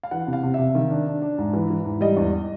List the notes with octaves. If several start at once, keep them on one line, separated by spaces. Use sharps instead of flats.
F5
E3 F#5
C3
F5
C3
C3 E5
D#3
D4
D4
D4
G#2
E3
E3
G#2
G3 D#5
E2